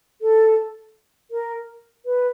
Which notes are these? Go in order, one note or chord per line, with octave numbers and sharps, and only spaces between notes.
A4
A#4
B4